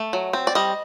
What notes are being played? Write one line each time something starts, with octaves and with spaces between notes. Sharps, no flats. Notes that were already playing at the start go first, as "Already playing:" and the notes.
Already playing: A3
F#3
C4
D5
G3 D#5